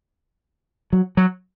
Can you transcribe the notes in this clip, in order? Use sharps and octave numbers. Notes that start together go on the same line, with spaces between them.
F#3
F#3